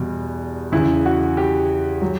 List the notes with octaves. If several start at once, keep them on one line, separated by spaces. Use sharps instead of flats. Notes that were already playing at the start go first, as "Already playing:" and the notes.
Already playing: E2 B2 G3
E2 C#3 E3 E4
F#4
G4
F#3